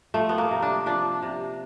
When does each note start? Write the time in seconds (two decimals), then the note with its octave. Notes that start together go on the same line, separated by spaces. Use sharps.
0.14 F3 A3
0.29 B3
0.38 A#3
0.51 C3
0.62 D4
0.86 F3 D4
1.23 C3